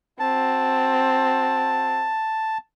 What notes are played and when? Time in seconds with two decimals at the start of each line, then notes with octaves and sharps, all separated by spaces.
0.20 C4 F#4 A5